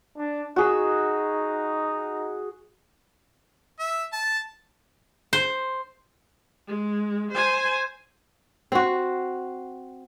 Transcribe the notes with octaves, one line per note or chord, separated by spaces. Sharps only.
D4
D#4 F#4 G#4 E6
E5
A5
C5
G#3
C5 G#5
C4 F#4